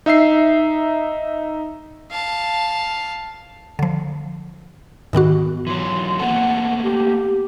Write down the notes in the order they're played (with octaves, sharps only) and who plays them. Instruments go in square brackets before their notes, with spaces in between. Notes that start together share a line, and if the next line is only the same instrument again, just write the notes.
[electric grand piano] D#4 E5 E6 C7
[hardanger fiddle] F5 A5
[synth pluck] D3 F3
G#2 D#3 B3 F#4
[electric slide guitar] E3 F#3 [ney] C6
[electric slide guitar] A#3 B3 A4 [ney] F#5
[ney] G4